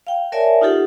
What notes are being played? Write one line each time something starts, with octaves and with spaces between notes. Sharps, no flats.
F5 G5
A#4 C#5 D5 E5 G#5 A5
D#4 F4 G4 A4 F#5